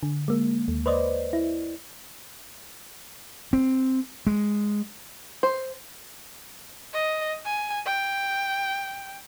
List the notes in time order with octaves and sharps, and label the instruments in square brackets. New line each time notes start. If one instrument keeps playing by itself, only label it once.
[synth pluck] D3
G#3 A#3
D#2
B4 C5 D5 D#5
E4
[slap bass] C4
G#3
[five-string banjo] C5
[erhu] D#5
G#5
G5